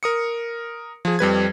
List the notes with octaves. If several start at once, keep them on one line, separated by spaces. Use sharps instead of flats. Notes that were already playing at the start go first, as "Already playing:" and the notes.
A#4 D#6 C#7
F3 G#4
F2 G3 B4 G#6